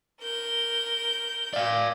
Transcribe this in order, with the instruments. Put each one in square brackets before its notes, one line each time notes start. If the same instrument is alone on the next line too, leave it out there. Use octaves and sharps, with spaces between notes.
[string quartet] A#4 G6
[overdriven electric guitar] D5 F5